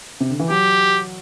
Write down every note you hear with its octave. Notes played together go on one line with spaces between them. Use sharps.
C3
D3
E3
F#3 G4